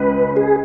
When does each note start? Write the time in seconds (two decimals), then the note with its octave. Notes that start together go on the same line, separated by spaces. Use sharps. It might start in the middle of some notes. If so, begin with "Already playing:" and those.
Already playing: C#2 G#3 C#4 B4
0.36 G#4